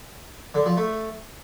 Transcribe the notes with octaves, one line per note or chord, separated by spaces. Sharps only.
D3
F3
A3